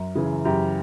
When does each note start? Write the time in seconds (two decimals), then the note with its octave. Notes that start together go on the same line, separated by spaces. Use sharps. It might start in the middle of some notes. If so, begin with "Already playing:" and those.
Already playing: F#2
0.15 C#3 E3 G#4
0.45 F#2 G4